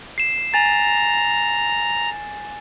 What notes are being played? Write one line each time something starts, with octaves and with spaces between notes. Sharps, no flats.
C7 E7
G#5 A#5 A6